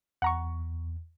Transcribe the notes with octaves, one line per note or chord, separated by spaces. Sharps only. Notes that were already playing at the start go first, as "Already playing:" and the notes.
E2 F#5 A#5 C#6